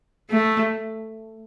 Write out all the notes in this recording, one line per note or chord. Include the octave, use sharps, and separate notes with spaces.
A3